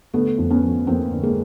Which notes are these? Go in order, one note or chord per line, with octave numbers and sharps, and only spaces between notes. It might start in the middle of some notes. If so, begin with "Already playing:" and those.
D3 A3 B3
F2
B3 C#4
F3
F2 A#3 C4
D3
G#3 A#3